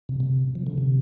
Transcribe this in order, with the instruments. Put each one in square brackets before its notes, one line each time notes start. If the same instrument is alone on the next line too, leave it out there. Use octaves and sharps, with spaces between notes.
[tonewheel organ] C3
C3
F3
D3
C3